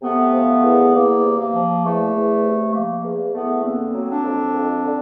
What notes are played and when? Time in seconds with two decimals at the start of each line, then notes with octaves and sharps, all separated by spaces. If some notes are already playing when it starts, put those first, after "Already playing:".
0.02 C3 A3 B3
0.33 F3
0.63 E2
0.93 E2 A#3
1.23 C3
1.37 A#3
1.54 F3
1.83 E2 A3
2.13 E2
2.44 C3
2.73 F3 A#3
3.03 E2
3.33 E2 A3 B3
3.63 D3 A#3 C4
3.93 F#3
4.09 C4 D4
4.23 F2
4.53 F2
4.85 D3